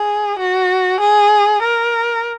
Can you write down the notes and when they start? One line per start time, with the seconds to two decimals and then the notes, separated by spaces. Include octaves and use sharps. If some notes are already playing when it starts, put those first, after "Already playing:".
Already playing: G#4
0.39 F#4
1.01 G#4
1.62 A#4